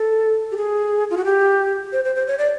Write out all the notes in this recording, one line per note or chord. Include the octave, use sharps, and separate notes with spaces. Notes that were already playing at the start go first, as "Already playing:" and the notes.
Already playing: A4
G4
G#4
F4
F#4
G4
C5
C5
C5
C#5
D5